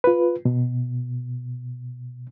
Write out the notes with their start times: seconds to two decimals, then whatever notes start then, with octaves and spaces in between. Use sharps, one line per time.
0.04 F4 B4
0.45 B2